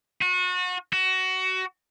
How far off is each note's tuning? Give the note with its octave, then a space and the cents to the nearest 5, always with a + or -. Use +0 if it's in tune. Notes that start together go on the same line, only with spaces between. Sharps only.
F#4 -30
F#4 +20